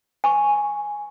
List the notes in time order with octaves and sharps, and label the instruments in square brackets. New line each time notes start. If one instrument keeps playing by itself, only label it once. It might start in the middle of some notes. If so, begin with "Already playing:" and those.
[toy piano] G#5 C#6